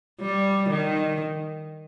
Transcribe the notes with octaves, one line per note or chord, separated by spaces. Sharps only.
G3
D#3